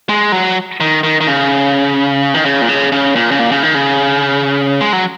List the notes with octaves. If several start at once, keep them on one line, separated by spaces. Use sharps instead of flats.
G#3
F#3
D#3
D#3
D#3
C#3
D#3
C#3
A#2
C#3
C#3
A#2
C#3
A#2
C#3
D#3
C#3
G#3
F#3